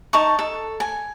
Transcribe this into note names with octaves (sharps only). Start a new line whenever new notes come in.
D#4 A5 C#6
A4
G#5